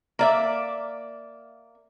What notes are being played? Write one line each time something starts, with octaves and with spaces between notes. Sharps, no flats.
A#3 D5 E5